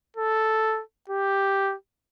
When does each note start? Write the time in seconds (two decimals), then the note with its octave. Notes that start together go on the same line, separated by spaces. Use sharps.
0.17 A4
1.10 G4